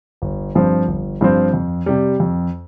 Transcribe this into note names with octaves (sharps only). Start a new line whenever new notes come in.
G1
G2 F3 C4
G1
G2 F3 C4
F2
C3 G3
F2